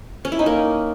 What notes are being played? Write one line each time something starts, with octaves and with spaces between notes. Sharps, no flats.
C#4
E4
D#4
A#3